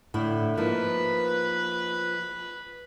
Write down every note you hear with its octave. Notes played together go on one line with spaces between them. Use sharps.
A2 D3 E4
F3 A#3 D#4 B4